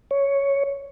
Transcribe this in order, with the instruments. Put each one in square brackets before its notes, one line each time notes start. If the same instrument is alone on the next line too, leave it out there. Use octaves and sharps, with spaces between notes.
[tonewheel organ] C#5